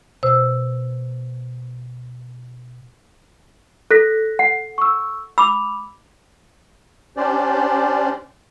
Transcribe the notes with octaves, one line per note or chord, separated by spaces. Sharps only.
B2 C5 E6
A4 F#6 A#6 B6
F#5
C#6 E6
B5 D6 E6 F7
C#4 D4 G4 C5 D5